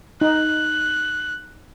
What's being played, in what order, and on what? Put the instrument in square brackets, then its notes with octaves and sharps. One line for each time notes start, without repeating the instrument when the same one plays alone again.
[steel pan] D#4 [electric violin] F#6